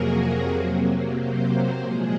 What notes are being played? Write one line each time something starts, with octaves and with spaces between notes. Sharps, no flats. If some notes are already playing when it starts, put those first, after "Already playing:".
Already playing: F2 C3 F#3 A#3 F#4 G#4 A#4
A#4
C3 F#3 A#3
C5
C5
A#2 F3 G#3 G#4